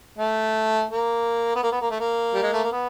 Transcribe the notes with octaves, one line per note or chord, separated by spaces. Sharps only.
A3
A#3
B3
A#3
B3
A#3
A3
A#3
G3
G#3
A3
A#3
B3